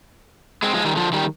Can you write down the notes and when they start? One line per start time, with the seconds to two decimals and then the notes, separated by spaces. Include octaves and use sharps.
0.63 G#3 C4
0.74 F3 G#3
0.85 D#3 G3
0.96 D3 F3
1.12 D#3 G3